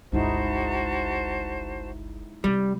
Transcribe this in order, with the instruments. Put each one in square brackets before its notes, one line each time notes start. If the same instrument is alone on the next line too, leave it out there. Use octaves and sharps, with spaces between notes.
[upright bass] G1 C#2 [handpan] G#3 D#4 E4 [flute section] F#4 C5 A5
[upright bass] C3 [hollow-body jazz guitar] G3